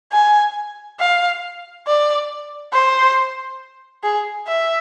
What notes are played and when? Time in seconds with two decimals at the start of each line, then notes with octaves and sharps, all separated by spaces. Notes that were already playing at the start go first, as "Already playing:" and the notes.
0.12 G#5
1.00 F5
1.87 D5
2.73 C5
4.04 G#4
4.47 E5